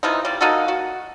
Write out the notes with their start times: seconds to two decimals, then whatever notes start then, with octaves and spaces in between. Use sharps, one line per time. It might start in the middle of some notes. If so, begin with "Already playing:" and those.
0.03 C3 E3 F3 D#4
0.25 G3 D5
0.41 A#3 D#4 F#4 A4
0.68 F#4